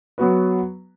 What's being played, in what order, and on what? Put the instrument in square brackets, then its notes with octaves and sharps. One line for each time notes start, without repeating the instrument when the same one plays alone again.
[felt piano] F#3 B3 F#4 B4